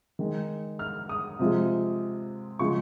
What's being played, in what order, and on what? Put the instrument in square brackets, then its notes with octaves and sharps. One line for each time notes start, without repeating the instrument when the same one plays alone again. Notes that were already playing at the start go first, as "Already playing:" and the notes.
[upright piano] D#3 G#3
F6
D#6
C3 F3 G#3
C#3 F3 G#3 C#6